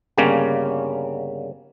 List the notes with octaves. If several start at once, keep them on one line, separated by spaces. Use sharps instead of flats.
G1 C#3 G3 A#3 C#4